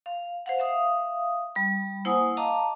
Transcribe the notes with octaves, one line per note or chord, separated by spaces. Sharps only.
F5
C5 F5 F#5
E5 F5 D#6
G3 B5
A#3 E4 C5 F#5 G#5 D#6
D#5 F5 A5 A#5 D6